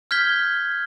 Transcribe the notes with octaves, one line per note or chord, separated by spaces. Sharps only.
F6 G6 G#6 B6 G7